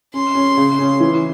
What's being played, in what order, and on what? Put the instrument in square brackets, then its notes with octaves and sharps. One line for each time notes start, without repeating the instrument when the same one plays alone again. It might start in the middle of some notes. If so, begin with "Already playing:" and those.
[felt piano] C#4 [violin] C6
[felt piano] C#4
C#3
C#4
E3